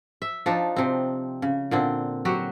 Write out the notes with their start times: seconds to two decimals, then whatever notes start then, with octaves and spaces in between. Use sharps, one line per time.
0.22 E5
0.46 F3 D4 D#4
0.76 C3 C4
1.42 C#3
1.71 A#2 D3 C4
2.25 F#3 F#4 G4